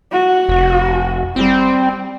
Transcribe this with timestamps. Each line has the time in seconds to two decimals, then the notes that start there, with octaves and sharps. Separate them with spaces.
0.12 F#4
0.49 F1
1.36 G3 C4